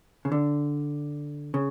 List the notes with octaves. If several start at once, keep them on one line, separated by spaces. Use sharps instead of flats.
C#3
D3
C#3